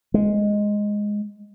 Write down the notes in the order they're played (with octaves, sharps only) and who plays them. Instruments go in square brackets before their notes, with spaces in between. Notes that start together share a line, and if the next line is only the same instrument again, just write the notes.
[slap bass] G#3